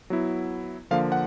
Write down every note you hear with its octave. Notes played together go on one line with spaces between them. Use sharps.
F#3 B3 E4
D3 F3 A#3 F5
F#5